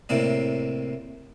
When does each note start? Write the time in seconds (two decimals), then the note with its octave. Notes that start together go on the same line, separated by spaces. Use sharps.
0.09 A2 C3 A#3 D5